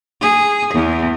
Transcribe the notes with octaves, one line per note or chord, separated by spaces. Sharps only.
G#4
E2